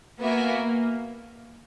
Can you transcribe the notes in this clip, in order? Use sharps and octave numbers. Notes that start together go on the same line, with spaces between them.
A#3 B3 F#4 A#4 E5 G#5